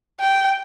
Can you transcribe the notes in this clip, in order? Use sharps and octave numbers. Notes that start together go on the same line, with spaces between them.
G5